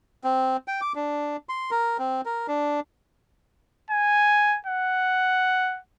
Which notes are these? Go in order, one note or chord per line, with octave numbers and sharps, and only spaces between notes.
C4
G5
D6
D4
C6
A#4
C4
A#4
D4
G#5
F#5